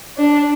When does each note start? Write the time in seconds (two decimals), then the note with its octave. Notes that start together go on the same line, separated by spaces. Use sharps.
0.16 D4